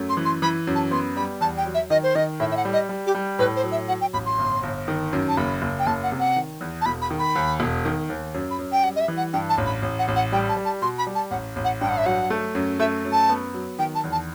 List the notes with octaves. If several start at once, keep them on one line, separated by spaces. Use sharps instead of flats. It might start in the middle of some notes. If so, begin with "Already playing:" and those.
Already playing: F#2 A3
C6
E3
C6
E3 B5
F#2
A5
B3 C6
G3 B5
E2 A5
G5
F#3
E5
D#3 D#5
C5
D#3 D#5
A2 E5
E5
F#5
G3
D#5
G3
G4
G3
A2 B4
C5
F#3
E5
F#3 F#5
G5
A1 B5
C6
G1
G1
D#3
F#2
A5
F#1 B5
F#1
G5
F#1 A5
F#5
C3
F#5
D#3
E2
A5
E1 B5
B5
D#3
B5
D#2
E1
D#3
D#2
F#2
B5
F#2
G5
G3 F#5
D#5
E5
E3
F#5
G2 G5
A5
A1
B5
A1
F#5
A1
F#5
G3 G5
A5
G3
A5
B2 C6
B5
G3
A5
A1 F#5
A1
F#5
G2 G5
F#5
E5
F#3 F#5
A3
F#2
A3 E5
F#2
A5
B3
F#3
D#3 G5
A5
E2
A5